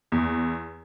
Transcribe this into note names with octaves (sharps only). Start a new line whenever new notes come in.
E2